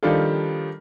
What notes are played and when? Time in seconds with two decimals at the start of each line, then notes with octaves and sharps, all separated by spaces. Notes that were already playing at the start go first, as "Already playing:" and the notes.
0.03 D#3 F3 G3 D4 F4 A4